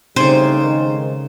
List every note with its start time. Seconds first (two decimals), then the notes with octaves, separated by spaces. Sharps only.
0.16 A2 C#3 G3 C4 D#4 C5 D5 G#5
0.60 D#3 G#3